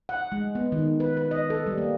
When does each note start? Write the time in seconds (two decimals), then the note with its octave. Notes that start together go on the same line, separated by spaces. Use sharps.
0.09 F#5
0.32 G#3
0.55 B3
0.72 D#3
1.00 B4
1.17 B4
1.31 D#5
1.50 A4
1.67 G3
1.78 A#3